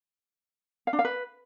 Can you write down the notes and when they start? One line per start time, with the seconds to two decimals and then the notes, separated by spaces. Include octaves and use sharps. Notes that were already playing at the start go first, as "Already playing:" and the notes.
0.87 F5
0.93 D4
0.99 F5
1.05 B4